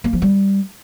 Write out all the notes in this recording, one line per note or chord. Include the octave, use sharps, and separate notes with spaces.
A#3
F3
G3